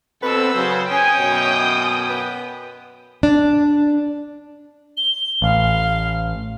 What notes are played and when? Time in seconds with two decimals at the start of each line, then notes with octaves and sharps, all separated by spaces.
0.23 B2 C4 A4 B4 E6
0.55 C#3 F#3 C5
0.91 C#4 G#4 G5 G#5 D#6
1.19 F#2 B2
2.09 B3
3.23 D4
4.97 G7
5.42 A1 F5